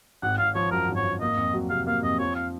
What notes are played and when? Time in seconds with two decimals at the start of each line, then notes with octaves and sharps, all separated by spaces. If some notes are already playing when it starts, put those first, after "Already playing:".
0.22 G#1 F#5
0.38 G#1 F5
0.55 F3 C#5
0.72 F#2 A#4
0.88 G#1
0.96 C#5
1.05 G#1
1.21 A#3 D#5
1.37 F2
1.54 F#3
1.70 C3 F5
1.87 A#3 F5
2.03 F2 D#5
2.19 F3 C#5
2.36 F5